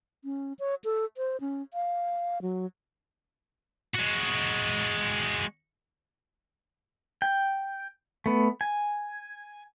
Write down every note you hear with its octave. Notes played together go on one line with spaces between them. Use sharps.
C#4
C#5
A4
C5
C#4
F5
F#3
G#3 F#4
G5
A3 B3
G#5